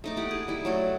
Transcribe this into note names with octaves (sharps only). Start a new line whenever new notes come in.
A3 D#4 D6
E4 G4 F#5
G#4
G3 E4
F#3 A3 F#4